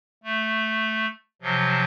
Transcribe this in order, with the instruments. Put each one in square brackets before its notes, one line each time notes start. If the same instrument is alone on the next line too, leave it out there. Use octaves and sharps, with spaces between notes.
[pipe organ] A3
C3 F3 F#3